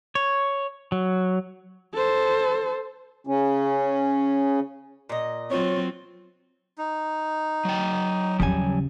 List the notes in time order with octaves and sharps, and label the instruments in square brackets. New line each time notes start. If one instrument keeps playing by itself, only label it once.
[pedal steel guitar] C#5
F#3
[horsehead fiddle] A4 C5
[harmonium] C#3 C#4
[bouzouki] A#2 D#5
[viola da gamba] F#3 C4 [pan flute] F4 [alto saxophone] C#5
[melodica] D#4
[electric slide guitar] F#3 G5
[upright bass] D#2 C#3 [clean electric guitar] F3 G3 G#5